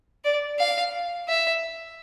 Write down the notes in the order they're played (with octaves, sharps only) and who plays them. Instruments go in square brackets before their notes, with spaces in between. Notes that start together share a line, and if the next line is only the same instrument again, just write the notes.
[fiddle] D5
F5
E5